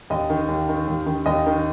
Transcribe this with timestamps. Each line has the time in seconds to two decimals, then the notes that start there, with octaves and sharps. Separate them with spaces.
0.10 D#2 D#5
0.30 D#3
0.49 D#2
0.69 D#3
0.88 D#2
1.06 D#3
1.26 D#2 D#5
1.46 D#3